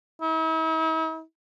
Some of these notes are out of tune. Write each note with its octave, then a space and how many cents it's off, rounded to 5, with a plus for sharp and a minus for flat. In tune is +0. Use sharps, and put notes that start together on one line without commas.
E4 -45